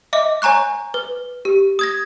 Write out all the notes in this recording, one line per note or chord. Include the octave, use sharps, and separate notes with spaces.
D#5 E5 D6
C#5 G#5 A#5 C#6 F#6
B4
G4
D#6 G#6 A#6